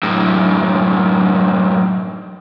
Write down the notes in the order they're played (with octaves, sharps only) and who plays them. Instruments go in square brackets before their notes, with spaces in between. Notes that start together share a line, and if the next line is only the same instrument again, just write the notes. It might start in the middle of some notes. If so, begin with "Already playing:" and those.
[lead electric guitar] F#2 A2